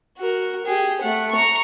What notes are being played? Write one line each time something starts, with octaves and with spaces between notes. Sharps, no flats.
F#4 A#4
G4 G#4
A3 F#5
A#5 C#6